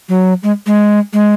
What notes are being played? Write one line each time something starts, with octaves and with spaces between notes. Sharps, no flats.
F#3
G#3
G#3
G#3